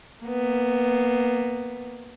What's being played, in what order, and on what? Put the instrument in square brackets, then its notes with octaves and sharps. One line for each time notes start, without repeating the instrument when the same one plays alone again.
[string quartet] A#3 B3